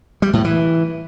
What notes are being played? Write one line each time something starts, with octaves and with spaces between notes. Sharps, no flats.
G3
A2
E3